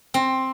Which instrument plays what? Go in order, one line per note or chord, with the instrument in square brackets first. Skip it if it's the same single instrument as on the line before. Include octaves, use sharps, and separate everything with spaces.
[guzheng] C4